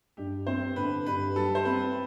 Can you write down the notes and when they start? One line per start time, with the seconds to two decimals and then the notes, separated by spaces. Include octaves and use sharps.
0.17 G2 G4
0.47 C4 C5
0.76 D3 B4
1.06 G2 B4
1.36 G3 A4
1.55 C5
1.65 C4 B4